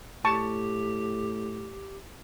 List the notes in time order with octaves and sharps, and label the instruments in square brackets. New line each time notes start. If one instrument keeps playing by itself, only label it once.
[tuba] A2 [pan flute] G4 [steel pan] A5 C#6